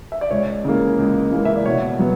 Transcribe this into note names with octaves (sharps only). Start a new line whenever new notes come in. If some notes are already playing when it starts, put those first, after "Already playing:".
E5
D5
C#2 C#5
C#3 E3 A#3
C#2
C#3 E3 A#3
E5
D5
B2 C#5
F#3 B3